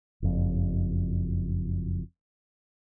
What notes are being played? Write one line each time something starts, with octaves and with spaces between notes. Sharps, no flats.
F#1 F2